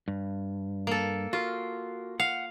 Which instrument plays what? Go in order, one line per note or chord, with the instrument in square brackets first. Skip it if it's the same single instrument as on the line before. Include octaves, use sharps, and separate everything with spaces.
[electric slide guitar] G2
[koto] A#3 A4
[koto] F4 [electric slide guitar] F#4 A#4
[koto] F5 [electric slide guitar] F#5